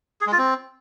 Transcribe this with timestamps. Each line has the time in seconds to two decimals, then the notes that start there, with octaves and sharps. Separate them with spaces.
0.21 G#4
0.27 G#3
0.32 F4
0.38 C4